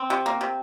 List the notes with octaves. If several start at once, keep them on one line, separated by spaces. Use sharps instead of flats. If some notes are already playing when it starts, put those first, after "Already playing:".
Already playing: C4
C3
A#3
C3